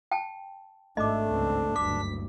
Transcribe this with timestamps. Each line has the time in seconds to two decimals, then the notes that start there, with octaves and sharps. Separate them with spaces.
0.11 G5 A5
0.97 G#1 A3 D4 D#5 D6
1.30 G1 C#2 C4
1.76 F#1 D2 G2 D6 B6